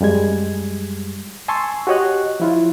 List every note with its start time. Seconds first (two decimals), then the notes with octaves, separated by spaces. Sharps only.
0.01 F#2 G3 G#3 G#6
1.48 G#5 A5 C6 C#6 E6
1.87 F#4 G4 C#5 D#5 F#6
2.40 F3 E4 F4